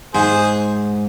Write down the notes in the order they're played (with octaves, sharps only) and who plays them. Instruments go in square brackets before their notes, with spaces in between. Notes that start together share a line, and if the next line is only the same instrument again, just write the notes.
[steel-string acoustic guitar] G#2 [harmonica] G#4 C5